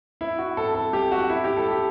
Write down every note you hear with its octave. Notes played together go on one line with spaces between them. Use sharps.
E4
F#4
A4
A4
G4
F#4
E4
G4
A4
G4